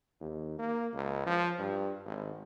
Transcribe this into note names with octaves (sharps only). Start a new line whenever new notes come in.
D#2
A#3
C#2
F3
G2
G#1